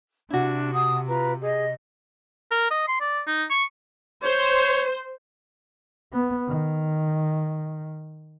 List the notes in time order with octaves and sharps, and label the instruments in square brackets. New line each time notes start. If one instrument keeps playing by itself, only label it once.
[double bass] C3 [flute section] D4 [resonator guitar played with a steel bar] E4 F#4
[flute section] F#5 A5 [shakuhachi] D#6
[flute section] F4 B4 [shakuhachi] A#5
[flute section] G#4 [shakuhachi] D#5
[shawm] A#4
D#5
C6
D5
D#4
C#6
[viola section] C5 [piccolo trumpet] C#5
[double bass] B3
D#3